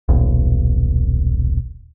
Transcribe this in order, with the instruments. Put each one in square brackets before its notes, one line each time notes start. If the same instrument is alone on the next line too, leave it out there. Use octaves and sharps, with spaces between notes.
[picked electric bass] D#1 B1